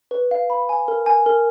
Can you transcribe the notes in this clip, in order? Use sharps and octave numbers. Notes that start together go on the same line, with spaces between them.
B4
F5
B5
G#5
A#4
G#5
A#4